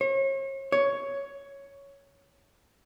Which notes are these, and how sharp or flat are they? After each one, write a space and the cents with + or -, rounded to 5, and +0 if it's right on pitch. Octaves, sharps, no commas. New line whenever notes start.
C#5 -40
C#5 +5